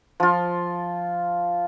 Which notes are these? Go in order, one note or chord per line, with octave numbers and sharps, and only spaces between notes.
F3 F4